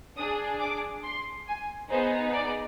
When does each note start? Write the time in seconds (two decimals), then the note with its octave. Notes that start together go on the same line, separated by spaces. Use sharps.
0.18 D4 G#4 D#6
0.61 D6
1.04 C6
1.48 G#5
1.91 B3 D#4 G#4 C5
2.33 D5